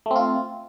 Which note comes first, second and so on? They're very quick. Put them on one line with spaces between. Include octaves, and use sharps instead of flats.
A3 C4 F4